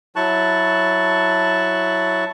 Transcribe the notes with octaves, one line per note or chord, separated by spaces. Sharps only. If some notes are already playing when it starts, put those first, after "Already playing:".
F#3 E4 A5 C#6 F#6